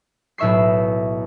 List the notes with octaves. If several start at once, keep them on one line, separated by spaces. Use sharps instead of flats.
B1 A2 E5 C#6 C7